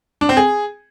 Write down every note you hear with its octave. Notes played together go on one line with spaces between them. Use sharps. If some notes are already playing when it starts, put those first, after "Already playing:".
D4
C4
G#4